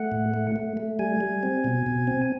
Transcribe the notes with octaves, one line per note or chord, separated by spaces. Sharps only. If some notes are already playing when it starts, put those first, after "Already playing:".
Already playing: A3 F#5
A2
A3
A3
A3
G3 G#5
G3
C4
B2
B2
C4